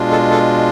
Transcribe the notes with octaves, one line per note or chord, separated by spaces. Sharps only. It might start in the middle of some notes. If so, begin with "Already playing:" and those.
Already playing: B2 G#3 D4 F4
A4
A4